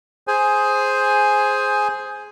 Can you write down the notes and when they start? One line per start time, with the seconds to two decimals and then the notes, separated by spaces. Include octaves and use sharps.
0.27 G#4 C5 G#5